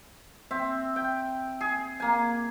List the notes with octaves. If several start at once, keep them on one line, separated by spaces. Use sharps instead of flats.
C4 E5
G5
G#4
A#3 G#5